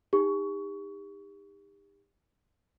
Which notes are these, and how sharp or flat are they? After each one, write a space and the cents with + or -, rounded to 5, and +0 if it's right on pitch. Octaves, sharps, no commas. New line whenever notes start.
D#4 +0 G4 +35 C#6 +20